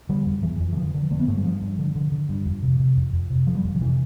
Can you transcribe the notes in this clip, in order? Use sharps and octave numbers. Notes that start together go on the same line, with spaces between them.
D3 G3
F2
F2 E3
F2
E3
D3 F3
D3
D3 A3
B3
G2 A3
G3
G2 F3
G2
D3
D3
D3
G2
F2
C3
C3
F2
F2
C3
F2 F3
G3
F2 F3
D3
C3 E3